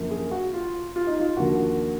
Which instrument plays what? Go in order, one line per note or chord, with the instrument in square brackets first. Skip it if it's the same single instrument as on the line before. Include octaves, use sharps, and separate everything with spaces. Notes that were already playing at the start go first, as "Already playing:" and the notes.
Already playing: [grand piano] F#2 D3 F3 A#3
G#4
F#4
F4
F4
D#4
F4
D#2 D3 F3 A#3 F#4